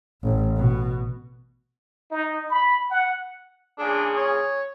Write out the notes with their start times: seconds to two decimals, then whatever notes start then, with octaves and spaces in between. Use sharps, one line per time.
0.23 A1
0.57 B2
2.11 D#4
2.50 B5
2.90 F#5
3.79 A#2 C#3 D4 G#4
4.17 C#5